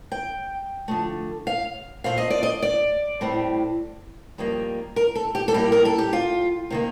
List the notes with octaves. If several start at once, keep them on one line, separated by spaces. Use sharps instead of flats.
G5
D3 F3 A3
F5
A#2 A3 C4 F5
D#5
D5
D#5
D5
A2 G3 C4
F2 D#3 G3 A#3
A#4
A4
G4
A4
A2 G3 A#3 G4
A#4
A4
G4
F4
C3 D#3 A#3